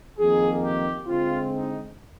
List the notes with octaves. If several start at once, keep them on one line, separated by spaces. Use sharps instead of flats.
F2 D#3 A#3 D#4 G#4
G4
D3 G#3 C4 F4
D#4